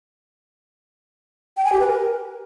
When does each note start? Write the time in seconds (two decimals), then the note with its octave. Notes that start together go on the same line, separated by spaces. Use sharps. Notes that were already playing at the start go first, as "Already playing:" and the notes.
1.57 G5
1.65 G#5
1.72 G4
1.80 B4
1.88 A#4